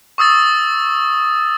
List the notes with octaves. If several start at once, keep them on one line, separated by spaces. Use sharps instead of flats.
C#6 D#6 E6 A6